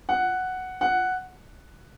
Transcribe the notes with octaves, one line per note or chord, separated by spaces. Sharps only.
F#5
F#5